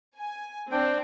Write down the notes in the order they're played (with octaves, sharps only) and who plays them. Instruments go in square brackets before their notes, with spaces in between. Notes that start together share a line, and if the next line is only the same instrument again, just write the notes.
[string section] G#5
[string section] C4 [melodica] D4 G5